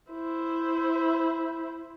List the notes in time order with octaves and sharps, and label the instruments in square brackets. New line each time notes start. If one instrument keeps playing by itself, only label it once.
[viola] E4 C5